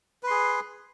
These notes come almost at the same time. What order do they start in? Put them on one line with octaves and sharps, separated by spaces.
B4 C6 G#4